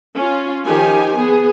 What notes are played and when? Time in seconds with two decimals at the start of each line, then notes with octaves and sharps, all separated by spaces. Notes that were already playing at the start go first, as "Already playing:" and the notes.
0.17 C#4 F4
0.66 D#3 F3 D#4 G4 G#5
1.17 B3 G#4